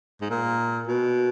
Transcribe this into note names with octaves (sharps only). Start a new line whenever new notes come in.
G#2
A#2
B2